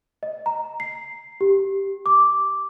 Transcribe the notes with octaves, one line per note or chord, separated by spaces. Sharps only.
D#5
A#5
C7
G4
D6